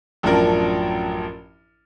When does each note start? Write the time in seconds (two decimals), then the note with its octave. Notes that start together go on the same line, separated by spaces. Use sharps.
0.23 A1 F#2 F3 D4 A#4